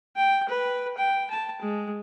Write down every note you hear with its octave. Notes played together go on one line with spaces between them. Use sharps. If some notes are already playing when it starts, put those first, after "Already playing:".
G5
B4
G5
A5
G#3